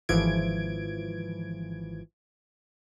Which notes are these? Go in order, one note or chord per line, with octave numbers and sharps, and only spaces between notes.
G#1 E3 F3 G#6 D7